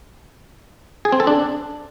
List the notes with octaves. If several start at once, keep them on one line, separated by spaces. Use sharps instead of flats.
G#4
C4
A4
D4